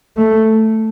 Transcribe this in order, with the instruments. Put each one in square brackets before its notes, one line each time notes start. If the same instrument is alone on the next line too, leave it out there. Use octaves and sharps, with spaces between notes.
[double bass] A3